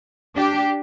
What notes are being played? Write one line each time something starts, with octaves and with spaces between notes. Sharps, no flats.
D4 G4